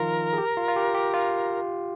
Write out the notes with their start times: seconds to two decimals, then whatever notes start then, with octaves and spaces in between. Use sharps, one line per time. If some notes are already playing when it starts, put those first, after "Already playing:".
Already playing: D#3 F3 D#4 F4 A#4
0.33 G#4
0.38 G4
0.57 F4
0.68 F4
0.76 G4
0.95 G4
1.14 F4